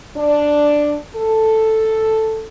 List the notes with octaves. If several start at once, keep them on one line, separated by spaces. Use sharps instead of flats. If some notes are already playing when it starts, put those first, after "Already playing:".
D4
A4